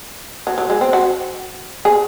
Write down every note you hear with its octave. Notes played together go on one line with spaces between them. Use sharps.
F#3
F#3
G#3
C4
F#4
G#4